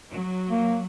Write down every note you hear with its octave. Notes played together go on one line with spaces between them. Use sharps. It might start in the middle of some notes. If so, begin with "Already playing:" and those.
F#3
A#3